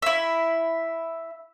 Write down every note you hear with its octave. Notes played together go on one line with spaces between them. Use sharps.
E4 E5